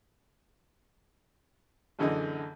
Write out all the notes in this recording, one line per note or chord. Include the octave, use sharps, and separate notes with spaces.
A#1 F#2 D3 E3 G#4 D#5